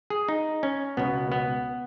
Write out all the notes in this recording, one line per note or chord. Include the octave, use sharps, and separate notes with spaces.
G#4
D#4
C#4
C#2 B2 B3
B3